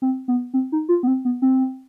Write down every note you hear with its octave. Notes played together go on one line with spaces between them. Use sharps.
C4
B3
C4
D#4
F4
B3
C4
B3
C4